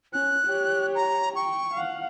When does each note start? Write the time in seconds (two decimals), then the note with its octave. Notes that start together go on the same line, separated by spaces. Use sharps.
0.13 C#4 F#6
0.46 G4 C#5
0.95 A#5
1.35 G5 C#6
1.74 F5 F#5